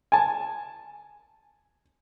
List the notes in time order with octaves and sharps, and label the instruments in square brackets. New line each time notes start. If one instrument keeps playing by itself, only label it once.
[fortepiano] G#5 A5